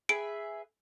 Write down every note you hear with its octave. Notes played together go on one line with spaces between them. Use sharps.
G#4 B4 E5 D7